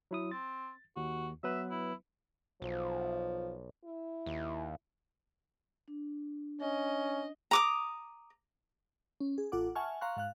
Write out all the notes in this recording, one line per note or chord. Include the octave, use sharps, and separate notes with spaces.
F#3 E4 D#6
C4 A6
D#2 F#4
F#3 B3 B4 E5
E4
B1 F3
E4
D#2
D4
C#4 D#5
A#5 D6 D#6
C#4
G#4
A1 F4 A4 F#5 D6
E5 F#5 G#5 A5 C#6 F6
F5 A#5 C6 C#6 F#6
G#2 F5 F#6